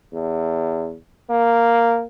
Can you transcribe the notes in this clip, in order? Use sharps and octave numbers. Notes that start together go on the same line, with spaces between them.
E2
A#3